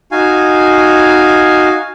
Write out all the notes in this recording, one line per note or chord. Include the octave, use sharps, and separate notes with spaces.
D#4 F#4 F5 G#5